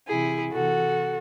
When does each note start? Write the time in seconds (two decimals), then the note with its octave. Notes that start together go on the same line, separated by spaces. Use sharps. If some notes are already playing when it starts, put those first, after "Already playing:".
0.08 C3 E3 E4 G#4
0.53 C3 E3 F#4 A4